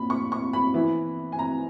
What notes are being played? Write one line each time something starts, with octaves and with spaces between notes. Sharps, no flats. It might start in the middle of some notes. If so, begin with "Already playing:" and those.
Already playing: A#2 A#3 B5
C#6
C#6
B5
E3 B3 E4
G#5
A#5